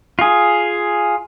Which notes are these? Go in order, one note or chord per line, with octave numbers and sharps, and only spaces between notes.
F4 G#4